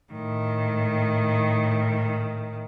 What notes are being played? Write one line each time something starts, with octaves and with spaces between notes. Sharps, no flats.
A2 D#3